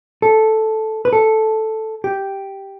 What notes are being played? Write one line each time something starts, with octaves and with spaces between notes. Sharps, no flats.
A4
B4
A4
G4